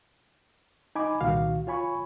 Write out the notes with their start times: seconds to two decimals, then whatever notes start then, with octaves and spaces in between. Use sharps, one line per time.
0.95 D#4 G#5 B5 D6
1.21 C2 A#2 D#3 F#4 F5
1.67 F4 C#5 G#5 B5 C#6